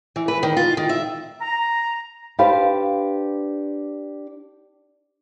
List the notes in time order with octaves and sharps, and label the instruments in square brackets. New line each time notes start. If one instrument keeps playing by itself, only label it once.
[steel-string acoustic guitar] E3
B4
D#3
F4
D#3
E5
[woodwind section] A#5
[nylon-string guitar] D4 G4 B4 C5 F5